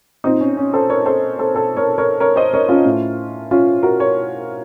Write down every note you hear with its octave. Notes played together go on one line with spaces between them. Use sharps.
A#2 C4 D#4
C#4
C#4
A4 C5
A#4 C#5
A4 C5
A4 C5
A4 C5
A#4 C#5
A#4 C#5
A#4 C#5
C5 D#5
A#4 C#5
C#4 F4
A2
C#4 F4
F#4 A#4
A#4 C#5